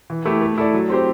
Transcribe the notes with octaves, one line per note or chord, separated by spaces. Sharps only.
E3
A3 E4 G4
A3
E4 A4 D5
F#3
C4 G4 C5